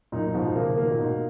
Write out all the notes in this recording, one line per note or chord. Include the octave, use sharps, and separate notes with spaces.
F#2 A#2 D#4
G#2 B2 F3
A#2 C#3 A#3
B2 D#3 A#3
A#2
G#2 B2 D#4